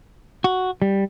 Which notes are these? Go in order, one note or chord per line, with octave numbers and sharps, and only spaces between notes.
F#4
G3